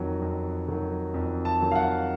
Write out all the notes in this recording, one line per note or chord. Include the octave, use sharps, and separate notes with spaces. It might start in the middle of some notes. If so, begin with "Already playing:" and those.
Already playing: F2 D#3 F#3
F2
D#3 F#3
F2
A5
D#3 F#3
F5
F#5